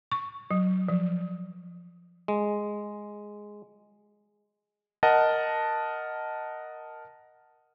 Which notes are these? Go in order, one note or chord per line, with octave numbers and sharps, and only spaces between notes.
C#6
F#3
F3
G#3
A#4 D#5 F#5 A5